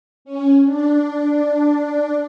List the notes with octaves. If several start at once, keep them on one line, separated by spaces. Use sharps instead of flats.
C#4
D4